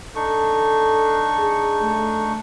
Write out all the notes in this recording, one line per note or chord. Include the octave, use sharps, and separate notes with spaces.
D4 D#4 A4 C#6
G#4
A3